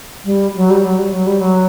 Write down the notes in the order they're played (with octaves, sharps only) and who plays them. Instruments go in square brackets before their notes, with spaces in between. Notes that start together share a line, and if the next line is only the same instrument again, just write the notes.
[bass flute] G3
F#3
G3
F#3
G3
F#3
G3
F#3